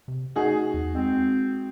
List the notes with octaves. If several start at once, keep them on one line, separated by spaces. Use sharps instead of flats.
C3
A3 D#4 F#4 G#4
E2
G#3 C4